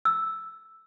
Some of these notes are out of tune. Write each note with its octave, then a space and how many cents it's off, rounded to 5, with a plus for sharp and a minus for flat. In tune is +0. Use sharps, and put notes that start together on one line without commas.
E6 +0